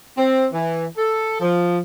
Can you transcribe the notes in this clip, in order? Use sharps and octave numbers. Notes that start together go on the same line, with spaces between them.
C4
E3
A4
F3